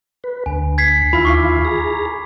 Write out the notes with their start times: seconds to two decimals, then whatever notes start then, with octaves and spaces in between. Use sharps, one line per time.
0.24 B4
0.46 D2 G#5
0.78 G#6 B6 C7
1.13 D#2 E4 F4 B5
1.25 C#6 D6 C7
1.65 G#4 A#5